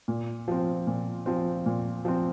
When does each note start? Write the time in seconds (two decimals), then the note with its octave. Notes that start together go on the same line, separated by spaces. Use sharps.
0.08 A#2
0.48 F3 C4
0.87 A#2
1.26 F3 C4
1.66 A#2
2.05 F3 C4